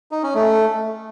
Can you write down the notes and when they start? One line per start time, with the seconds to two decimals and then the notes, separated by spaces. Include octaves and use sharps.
0.11 D#4
0.23 C#4
0.35 A3